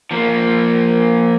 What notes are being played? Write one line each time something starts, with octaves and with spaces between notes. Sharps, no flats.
F3 A#3